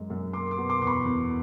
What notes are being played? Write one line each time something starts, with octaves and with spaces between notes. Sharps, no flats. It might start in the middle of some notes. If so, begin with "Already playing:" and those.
Already playing: F#2 G#3
F#2
A#3 C6 D6
C6 D6
B2
C6 D6
E2 C6
B5 C#6
E2